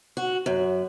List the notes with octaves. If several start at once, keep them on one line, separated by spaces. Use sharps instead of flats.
F#4
F#2